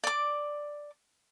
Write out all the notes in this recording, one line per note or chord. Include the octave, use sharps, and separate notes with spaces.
D5 D6